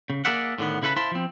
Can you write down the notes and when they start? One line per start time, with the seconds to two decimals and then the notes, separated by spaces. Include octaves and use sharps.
0.10 C#3
0.25 A#3 G#4 A#4 D5 E5 F#5
0.58 A2 D3 D#3 B3
0.82 C#3 E4 A4 B4 B5
0.97 E4 C5 F5 A5 B5
1.12 F3 C4